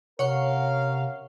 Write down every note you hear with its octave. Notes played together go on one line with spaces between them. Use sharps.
C3 C#4 A#4 C#5 F5 F#5 C#6